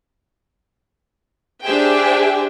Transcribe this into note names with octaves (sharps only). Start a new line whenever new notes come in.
D4 G4 G#4 C5 E5 G5